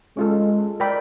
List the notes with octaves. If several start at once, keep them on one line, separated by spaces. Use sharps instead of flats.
G#3 C#4 F4 A4
A#4 D5 G5 B5